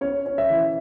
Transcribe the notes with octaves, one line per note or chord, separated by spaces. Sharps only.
C#4 C#5
C#4
E5
E3